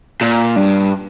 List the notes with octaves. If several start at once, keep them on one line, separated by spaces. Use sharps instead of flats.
A#2
G2